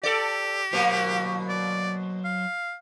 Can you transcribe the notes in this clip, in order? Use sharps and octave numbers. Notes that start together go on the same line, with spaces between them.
G4 A4 D5
B2 F#3 A#3 C5
D5
F5